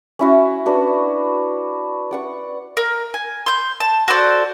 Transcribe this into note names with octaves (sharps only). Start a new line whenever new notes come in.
C#4 E4 F#4
B3 D4 F#4
D5 F#5 C#6
A#4
G#5
C6 G6
A5
F#4 A4 C5 D5